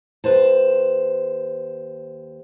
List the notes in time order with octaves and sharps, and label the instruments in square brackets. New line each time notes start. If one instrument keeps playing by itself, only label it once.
[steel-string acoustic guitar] D#2 B4 C5 A5